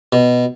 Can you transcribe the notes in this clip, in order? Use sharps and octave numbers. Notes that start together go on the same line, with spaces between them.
B2